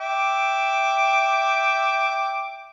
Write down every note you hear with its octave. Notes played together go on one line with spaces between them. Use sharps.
E5 G5 D6